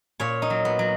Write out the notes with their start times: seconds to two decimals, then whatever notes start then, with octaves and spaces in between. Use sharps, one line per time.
0.20 A#2 C#5
0.42 D#4
0.50 F#3
0.65 B3
0.79 F#3